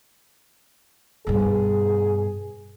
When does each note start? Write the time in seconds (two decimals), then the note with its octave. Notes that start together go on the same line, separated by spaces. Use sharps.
1.27 G2 B2 G#4